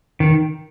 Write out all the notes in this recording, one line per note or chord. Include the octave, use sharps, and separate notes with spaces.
D#3